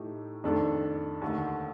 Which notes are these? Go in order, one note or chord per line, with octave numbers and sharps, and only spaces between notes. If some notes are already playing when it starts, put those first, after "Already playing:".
Already playing: A2 A3 D#4 G4
F2 D#3 A3 D4 A4
D#2 D3 A3